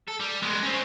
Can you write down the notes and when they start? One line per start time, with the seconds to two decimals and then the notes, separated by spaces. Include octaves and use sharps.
0.08 A4
0.20 G3
0.42 G#3 B3
0.63 C4 C#4